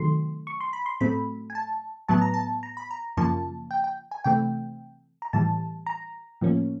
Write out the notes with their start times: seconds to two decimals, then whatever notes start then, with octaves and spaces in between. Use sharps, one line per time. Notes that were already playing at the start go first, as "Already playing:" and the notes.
Already playing: C3 D#3 F#3 A3 C6
0.47 C#6
0.61 C6
0.73 B5
0.86 C6
1.00 A2 F#3 A3 C4 B5
1.50 G#5
1.55 A5
2.09 A2 F#3 B3 A5
2.21 A#5
2.34 A5
2.63 A#5
2.77 B5
2.91 A#5
3.17 F#2 C#3 F3 A#3 A5
3.71 G5
3.84 G5
4.11 G#5
4.24 C3 E3 A3 C4 G5
5.22 A#5
5.33 A2 E3 G3 A5
5.86 A#5
6.41 A2 F3 A#3 C#4